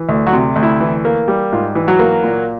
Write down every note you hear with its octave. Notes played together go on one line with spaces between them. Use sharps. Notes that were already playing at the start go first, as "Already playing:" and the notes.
Already playing: E3
D2
F#3 F#4
C3
D2
E4
E3
A#3
G3
G#2 F4
E3
F#3 F#4
A#3
A#2